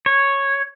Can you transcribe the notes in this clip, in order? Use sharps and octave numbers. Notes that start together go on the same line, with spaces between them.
C#5